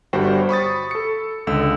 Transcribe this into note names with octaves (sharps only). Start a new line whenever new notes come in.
G1 G2 G3 F#4 C5 G5
B5 C#6 D#6 A6
A4 C#7
C#2 D3 E6